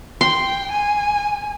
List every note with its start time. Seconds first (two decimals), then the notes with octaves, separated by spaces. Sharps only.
0.21 G5 C6
0.71 G#5